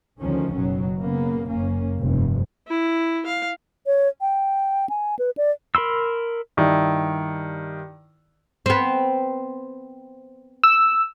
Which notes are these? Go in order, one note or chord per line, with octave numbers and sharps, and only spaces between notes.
D2 D3 D#3 F3 C#4
F#1 B2 D#3 F#3
C#3 A#3 B3
F#1 F#2 A#3 C#4
F1 G2
E4
F5
C#5
G5
G#5
B4
D5
A#4 B5 C6 E6
G2 D#3 E4
B3 C4
E6